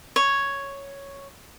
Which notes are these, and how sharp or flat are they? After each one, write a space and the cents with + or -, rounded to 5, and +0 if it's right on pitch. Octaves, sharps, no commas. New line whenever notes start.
C#5 +0